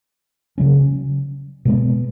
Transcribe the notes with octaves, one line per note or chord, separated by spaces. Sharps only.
C#3 F#3 C#4
B2 G#3 B3